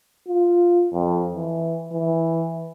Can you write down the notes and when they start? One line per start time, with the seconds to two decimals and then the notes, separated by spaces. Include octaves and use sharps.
0.28 F4
0.92 F2
1.35 E3
1.93 E3